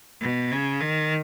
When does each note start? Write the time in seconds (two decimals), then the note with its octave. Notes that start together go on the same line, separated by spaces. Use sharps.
0.20 B2
0.51 C#3
0.80 D#3